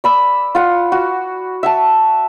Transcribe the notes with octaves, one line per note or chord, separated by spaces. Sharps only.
D5 B5 E6
F4 F#5
F#4
E5 F#5 A5